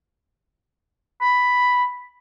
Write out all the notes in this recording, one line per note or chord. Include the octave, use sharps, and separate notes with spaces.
B5